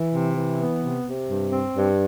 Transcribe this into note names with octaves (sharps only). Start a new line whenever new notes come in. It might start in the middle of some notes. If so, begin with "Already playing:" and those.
Already playing: E3
C3
E3
B3
C3
C3
G2
C4
G2